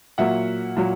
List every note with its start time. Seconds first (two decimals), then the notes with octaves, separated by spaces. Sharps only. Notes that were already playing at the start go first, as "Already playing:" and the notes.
0.18 A#2 F#3 A#3 E5 F#5
0.77 A#2 F#3